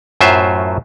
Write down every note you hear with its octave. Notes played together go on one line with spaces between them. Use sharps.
F#2 A2 F#3 F4 C5 E5